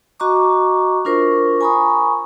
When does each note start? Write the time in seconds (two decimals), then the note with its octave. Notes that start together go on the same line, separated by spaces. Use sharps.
0.20 F#4 D#5 A#5 C#6 D6
1.05 D4 F4 A#4 C5 C#6
1.61 G#5 A#5 B5 C#6 D#6